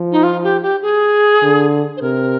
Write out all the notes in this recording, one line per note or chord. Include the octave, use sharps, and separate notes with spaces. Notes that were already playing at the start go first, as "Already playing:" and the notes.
Already playing: F3
D#4
F4
G4
G4
G#4
D3
C5
C3 A#4